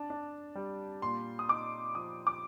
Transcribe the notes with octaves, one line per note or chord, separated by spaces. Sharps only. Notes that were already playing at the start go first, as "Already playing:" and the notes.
Already playing: D4 A5
D4
G3
A#2 C6
D#6
D#4 D6
F3 D#6
D6